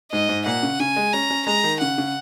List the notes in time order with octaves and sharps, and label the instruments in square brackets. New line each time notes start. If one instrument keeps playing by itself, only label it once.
[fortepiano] G#2 [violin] D#5
[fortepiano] G#2
[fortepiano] A#2 [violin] F#5
[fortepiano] C#3
[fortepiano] C#3 [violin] G#5
[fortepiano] G#3
[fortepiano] C#4 [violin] A#5
[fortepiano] C#4
[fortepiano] G#3 [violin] A#5
[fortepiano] D#3
[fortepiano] C#3 [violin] F#5
[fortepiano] C#3